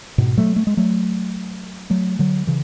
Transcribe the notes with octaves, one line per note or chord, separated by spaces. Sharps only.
G#2 B2
F#3 A3
A3
G#3
F#3 A3
F#3 A3
D3 F#3
C#3 E3